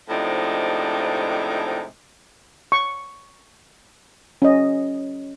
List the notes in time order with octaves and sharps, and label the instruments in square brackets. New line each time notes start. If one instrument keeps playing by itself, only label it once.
[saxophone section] A2 C3 F3 G#3 D4 D#4
[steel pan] C#6
C#4 D#5